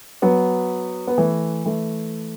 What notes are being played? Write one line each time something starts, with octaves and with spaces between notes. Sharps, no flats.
F#3 B3
B3
E3 A3
E3 A3